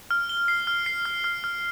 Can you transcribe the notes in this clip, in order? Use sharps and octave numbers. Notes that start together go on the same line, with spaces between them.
F6
G7
C7
F6
C7
F6
F6
F6